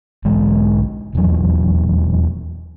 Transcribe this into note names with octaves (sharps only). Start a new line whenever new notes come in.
B1 G#2 D3 G#3
D#1 E2 F#3